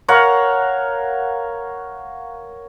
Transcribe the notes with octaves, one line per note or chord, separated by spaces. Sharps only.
A#4 C#5 F5 F#5